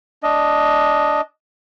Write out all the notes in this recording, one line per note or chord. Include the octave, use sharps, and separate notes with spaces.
D4 D#5